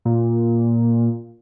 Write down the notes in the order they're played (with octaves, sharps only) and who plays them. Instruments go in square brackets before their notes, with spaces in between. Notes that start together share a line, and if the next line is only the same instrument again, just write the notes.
[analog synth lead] A#2